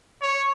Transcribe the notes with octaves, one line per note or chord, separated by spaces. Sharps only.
C#5